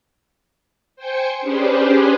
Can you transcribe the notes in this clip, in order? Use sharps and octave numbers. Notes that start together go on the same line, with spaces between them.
C5 G5 G#5 C#7
C#4 D4 G4 G#4 B4 C5